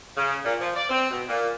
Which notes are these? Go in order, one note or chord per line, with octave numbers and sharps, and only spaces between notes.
C#3
A#2
F3
D5
C4
B2
A#2